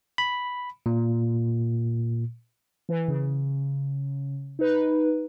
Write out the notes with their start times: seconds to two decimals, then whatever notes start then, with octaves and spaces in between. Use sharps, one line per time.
0.18 B5
0.86 A#2
2.89 E3
3.08 C#3
4.59 D#4 B4